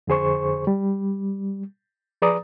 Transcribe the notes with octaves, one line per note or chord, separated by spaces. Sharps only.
F2 D3 G#4 C5 C#6
G3
F3 G#4 B4 D5 A#5 D#6